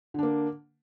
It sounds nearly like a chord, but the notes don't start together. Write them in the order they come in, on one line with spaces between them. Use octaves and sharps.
D3 D4 A#3